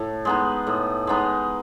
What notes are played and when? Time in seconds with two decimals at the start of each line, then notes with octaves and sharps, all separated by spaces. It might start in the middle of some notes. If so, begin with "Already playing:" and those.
Already playing: A2
0.25 G#3 B3 D#4
0.67 A2
1.07 G#3 B3 D#4